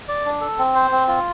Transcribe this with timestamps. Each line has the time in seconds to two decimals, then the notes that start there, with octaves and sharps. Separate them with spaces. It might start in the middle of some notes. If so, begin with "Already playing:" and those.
0.09 D5
0.25 D4
0.41 A4
0.59 C4
0.75 C5
0.92 C4
1.08 F4